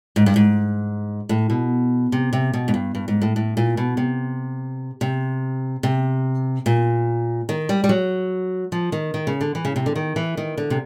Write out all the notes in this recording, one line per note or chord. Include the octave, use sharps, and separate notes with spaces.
G#2
G2
G#2
A2
B2
C3
C3
B2
G#2
G2
G2
G#2
A2
A2
A#2
B2
C3
C3
C3
A#2
D#3
G3
G3
F#3
F3
D#3
D#3
C#3
D3
E3
C#3
C3
D3
D#3
E3
D#3
D3
C3